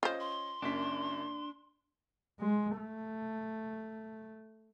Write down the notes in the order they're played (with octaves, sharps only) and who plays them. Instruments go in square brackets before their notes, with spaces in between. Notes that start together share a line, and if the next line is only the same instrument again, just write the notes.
[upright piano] C#4 D#5 [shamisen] F4 C5
[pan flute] C6
[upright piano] F#1 F#2 B6 [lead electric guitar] D4
[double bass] G#3
A3